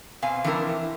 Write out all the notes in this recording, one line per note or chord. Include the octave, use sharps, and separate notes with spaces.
B2 C4 F5 G#5
E3 F3 C4 D4 E4 A#4